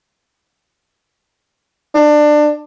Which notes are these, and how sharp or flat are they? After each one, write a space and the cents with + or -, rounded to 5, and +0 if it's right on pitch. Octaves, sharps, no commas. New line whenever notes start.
D4 +20